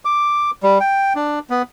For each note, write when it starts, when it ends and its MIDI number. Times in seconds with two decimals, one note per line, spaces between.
0.05 0.51 86
0.63 0.79 55
0.80 1.13 79
1.16 1.39 62
1.50 1.62 59